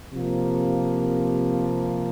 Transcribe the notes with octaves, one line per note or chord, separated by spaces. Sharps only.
C3 F3 A#3